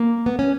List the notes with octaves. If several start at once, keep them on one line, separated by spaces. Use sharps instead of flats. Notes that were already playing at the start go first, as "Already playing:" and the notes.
Already playing: A#3
B3
C#4